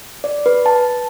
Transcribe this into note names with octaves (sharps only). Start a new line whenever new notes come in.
D5
B4
A5